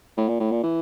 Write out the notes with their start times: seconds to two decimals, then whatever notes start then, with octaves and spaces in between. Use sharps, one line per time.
0.18 A2
0.29 A#2
0.40 A2
0.52 A#2
0.63 E3